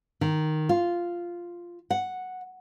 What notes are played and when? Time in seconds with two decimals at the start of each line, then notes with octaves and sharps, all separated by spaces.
0.21 D#3
0.69 F4
1.90 F#5